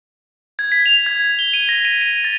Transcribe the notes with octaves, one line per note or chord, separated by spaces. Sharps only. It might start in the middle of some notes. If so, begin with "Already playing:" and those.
G#6
B6
F7
G#6
G7
D#7
A#6
D#7
D#7
A6